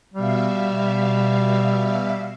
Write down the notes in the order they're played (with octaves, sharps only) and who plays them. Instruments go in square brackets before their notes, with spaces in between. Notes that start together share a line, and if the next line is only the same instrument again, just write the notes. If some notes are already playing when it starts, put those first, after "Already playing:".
[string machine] B2 E5 F5 [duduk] G3